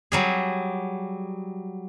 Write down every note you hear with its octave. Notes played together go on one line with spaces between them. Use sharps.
F#3 G3 G#4